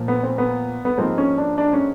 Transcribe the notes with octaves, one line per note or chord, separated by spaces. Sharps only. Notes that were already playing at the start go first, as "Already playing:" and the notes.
Already playing: A#2 F3 A#3
B3
C4
B3
B3
G#2 F3 A#3 C4
C#4
D4
D4
C#4